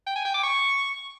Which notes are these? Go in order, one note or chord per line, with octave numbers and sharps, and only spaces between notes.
G5
G#5
G5
D6
C#6